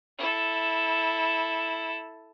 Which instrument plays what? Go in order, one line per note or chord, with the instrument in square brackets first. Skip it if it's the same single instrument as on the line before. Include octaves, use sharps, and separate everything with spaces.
[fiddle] E4 A4